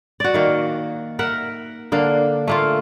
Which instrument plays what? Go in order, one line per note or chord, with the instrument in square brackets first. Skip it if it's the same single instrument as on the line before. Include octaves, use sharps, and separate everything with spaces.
[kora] F#4 D5
D#3 A#3
A#4 E5 F#5
D3 A#3 D4
A3 A#3 F4